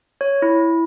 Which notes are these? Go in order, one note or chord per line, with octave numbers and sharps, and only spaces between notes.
C#5
E4